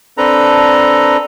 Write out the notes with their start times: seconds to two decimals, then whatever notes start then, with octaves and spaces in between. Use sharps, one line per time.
0.18 C4 D4 A4 B4 A#5